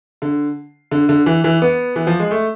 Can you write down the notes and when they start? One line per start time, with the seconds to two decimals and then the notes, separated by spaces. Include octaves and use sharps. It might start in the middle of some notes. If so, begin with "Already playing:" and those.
0.22 D3
0.91 D3
1.09 D3
1.26 E3
1.44 E3
1.62 B3
1.96 E3
2.07 F3
2.20 G#3
2.31 A3